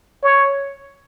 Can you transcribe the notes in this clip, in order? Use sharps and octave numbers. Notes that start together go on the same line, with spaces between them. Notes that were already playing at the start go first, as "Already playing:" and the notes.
C#5